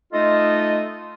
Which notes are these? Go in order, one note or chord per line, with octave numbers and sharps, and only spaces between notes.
A3 D#4 F4 A4 D#5